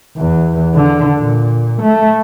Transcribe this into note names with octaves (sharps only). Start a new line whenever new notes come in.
E2
D3
A#2
A3